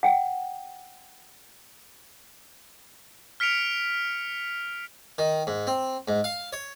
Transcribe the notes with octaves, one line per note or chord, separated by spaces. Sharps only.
F#5 G5
F6 B6 C#7 D7 F7
D#3
G#2
C4
G#2
F5
C#5